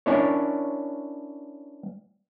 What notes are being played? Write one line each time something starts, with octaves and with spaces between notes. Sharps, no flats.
C#4 D4 E4 A#4 C#5